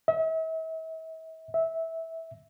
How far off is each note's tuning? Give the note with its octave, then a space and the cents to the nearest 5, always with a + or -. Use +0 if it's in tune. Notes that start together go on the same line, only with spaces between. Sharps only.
E5 -40
E5 -15